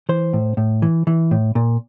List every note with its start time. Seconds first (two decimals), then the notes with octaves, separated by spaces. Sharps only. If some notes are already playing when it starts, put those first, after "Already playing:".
0.09 E3 C5
0.33 A2
0.57 A2
0.82 E3
1.07 E3
1.31 A2
1.55 A#2